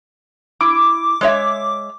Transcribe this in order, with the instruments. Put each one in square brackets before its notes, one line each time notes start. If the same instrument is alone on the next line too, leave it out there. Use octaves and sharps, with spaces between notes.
[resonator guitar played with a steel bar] E4 [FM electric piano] D6
[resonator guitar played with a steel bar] G#3 C#5 E5